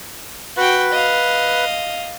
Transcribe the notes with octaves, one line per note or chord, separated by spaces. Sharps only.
F#4 B4 G5
D#5 F5